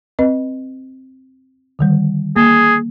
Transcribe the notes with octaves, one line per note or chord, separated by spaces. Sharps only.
C4 B4 D#5
D3 D#3 G3
A#3 G#4